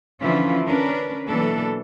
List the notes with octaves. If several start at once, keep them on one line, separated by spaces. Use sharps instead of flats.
D3 E3 F3 C#4 E4 F4
C#4 D4 A#4 B4
B2 E3 F#3 A#3 D4 A4